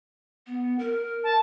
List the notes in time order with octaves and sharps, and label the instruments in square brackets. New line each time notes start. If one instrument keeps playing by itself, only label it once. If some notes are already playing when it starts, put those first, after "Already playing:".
[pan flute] B3
A#4
[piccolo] A5